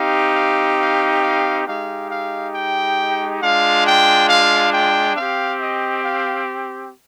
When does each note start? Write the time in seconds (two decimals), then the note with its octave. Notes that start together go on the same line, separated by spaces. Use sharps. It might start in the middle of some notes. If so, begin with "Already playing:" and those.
Already playing: C4 D#4 G4 F5
0.35 F5
0.80 F5
1.23 F5
1.67 G#3 D#4 G4 F5
2.11 F5
2.55 G5
3.42 G#3 D4 F4 F5
3.86 G5
4.29 F5
4.73 G5
5.17 C4 G4 F5
5.61 D#5
6.05 F5